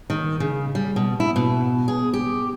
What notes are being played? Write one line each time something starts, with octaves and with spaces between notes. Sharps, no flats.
D#3
C#3
G3
B2
E4
B2
G#4
G4